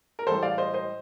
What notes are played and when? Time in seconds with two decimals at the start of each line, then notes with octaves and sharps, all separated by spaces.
0.19 A#4
0.27 A1 A2 G3 A4 C5
0.42 D5 F5
0.58 C5 D#5
0.74 C5 D#5